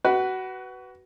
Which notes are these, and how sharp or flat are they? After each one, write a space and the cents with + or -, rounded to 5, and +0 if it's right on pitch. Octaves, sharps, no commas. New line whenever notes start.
F#4 +20 B4 +0